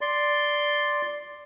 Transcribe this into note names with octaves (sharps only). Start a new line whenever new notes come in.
D5 C6